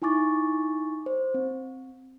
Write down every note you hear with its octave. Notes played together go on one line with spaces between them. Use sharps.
D#4 E4 G#5 C#6 D6 A6
C5
C4